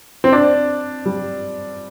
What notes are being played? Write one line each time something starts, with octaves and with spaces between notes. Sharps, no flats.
C4
D4
G3